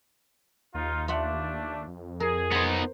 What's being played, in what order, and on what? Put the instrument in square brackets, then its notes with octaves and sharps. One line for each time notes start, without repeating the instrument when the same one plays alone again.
[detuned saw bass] D#2 [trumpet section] D#4 F4
[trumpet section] A3 D4 [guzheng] F4 E5 F#5
[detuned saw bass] F2
[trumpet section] G#4 [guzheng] A#4
[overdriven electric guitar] B3 D#4 [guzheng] C5 A#5